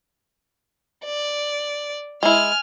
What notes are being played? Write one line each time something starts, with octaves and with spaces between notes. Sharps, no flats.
D5
G#3 E4 G#5 F6